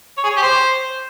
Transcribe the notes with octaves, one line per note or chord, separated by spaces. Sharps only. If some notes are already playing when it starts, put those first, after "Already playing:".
C#5
G#4
C#5
G4
C5